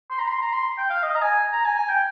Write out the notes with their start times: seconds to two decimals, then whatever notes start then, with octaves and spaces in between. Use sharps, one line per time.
0.11 C6
0.19 A#5
0.28 C6
0.42 A#5
0.53 C6
0.78 G5
0.90 F5
1.03 D#5
1.15 A#5
1.22 G#5
1.53 A#5
1.65 G#5
1.77 G#5
1.89 G5